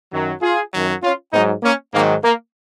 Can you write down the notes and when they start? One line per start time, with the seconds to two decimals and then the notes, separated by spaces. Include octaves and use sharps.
0.12 F#2 D#3 F#3
0.42 F4 G#4
0.73 F#2 D#3 F#3
1.03 C#4 F4
1.33 G#2 F#3 B3 D#4
1.63 A#3 C#4
1.94 G#2 D#3 F#3 A#3
2.24 A#3